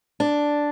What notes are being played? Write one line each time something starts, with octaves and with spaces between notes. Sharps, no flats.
D4